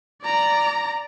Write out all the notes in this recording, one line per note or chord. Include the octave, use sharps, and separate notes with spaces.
D5 A#5